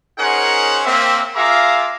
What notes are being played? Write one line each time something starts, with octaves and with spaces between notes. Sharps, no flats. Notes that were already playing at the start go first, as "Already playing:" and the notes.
C#4 D#4 G#4 A#4 C5 F#5
A#3 C4 E5
F4 G#4 E5 F5 A#5 D6